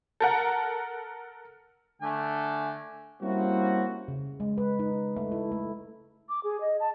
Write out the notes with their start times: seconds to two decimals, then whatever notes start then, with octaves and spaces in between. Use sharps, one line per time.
0.20 A4 A#4 F#5
2.02 D3 A3 G#5
3.21 G3 A#3 C4 C#4 E4 F#4
4.08 C#3
4.40 G#3
4.58 B4
4.79 D#4
5.17 A3
5.32 E4
5.52 A3
6.29 D6
6.44 G#4
6.61 D#5
6.80 A5